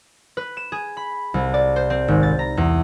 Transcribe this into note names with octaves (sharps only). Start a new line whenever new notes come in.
B4
E7
G#4
B5
C2
D5
C5
C4
G#1
A6
A#5
E2